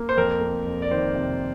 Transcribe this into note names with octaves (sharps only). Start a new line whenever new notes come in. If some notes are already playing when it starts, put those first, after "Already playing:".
Already playing: A#3
C5
F2 A#4
A#3
F2
D5
D#3 C5
C3